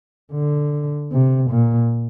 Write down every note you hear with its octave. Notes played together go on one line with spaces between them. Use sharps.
D3
C3
A#2